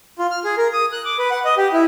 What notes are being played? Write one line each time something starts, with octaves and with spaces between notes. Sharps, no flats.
F4
F6
G#4
A#4
D#6
F#6
D6
B4
F#5
D#5
G4
E4